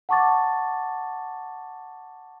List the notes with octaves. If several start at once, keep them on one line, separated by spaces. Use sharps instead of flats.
F#5 A5 C#6 D6 A6